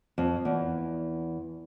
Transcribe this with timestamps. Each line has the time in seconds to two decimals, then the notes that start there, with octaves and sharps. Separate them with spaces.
0.18 F2
0.45 E2